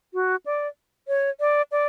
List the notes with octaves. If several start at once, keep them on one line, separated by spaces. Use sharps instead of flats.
F#4
D5
C#5
D5
D5